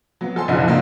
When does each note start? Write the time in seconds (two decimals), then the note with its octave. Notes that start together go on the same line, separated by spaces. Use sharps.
0.21 F#3 B3
0.36 A4 G#5 C6
0.48 F#1 B1 D3 F3 E4 F#5
0.67 D3 A#3 D#4